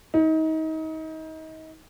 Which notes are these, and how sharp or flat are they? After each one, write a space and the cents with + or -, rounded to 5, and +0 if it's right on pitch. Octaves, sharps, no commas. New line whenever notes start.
D#4 +30